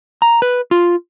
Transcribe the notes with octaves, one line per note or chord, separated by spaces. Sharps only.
A#5
B4
F4